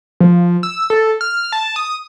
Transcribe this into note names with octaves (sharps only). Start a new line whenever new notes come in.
F3
E6
A4
F6
A5
D#6